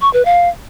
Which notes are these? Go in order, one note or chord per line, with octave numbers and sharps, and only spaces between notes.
C#6
B4
F5